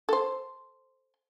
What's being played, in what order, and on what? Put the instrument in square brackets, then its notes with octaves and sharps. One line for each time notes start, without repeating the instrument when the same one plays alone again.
[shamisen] A4 C5